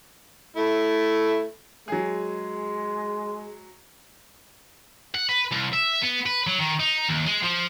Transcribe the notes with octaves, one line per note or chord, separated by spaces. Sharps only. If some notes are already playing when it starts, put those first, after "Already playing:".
A3 E4
F#3 G#3 G#4
F#5
B4
C2
E5
B3
B4
F#3
D#3
D#4
D#2
G#3
F3